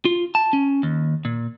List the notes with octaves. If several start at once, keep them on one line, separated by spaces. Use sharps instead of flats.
F4
A5
C#4
D#2
A#2